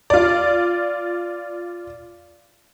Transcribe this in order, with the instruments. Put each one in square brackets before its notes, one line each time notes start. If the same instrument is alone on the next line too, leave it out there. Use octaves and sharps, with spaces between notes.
[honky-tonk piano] F4 D5